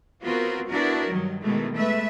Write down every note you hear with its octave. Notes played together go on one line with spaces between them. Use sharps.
B3 C4 F4 F#4 A#4
B3 D4 E4 F#4 A#4
G2 D#3 F#3
B2 D#3 E3 G#3 A3
G#3 A3 B4 E5